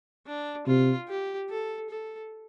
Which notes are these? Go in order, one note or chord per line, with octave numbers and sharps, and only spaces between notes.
D4
C3 F4
G4
A4
A4